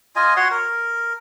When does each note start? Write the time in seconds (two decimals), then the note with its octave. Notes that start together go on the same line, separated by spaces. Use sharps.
0.16 F4 D#5 G#5
0.36 F#4 C#5 F#5 C6
0.51 A#4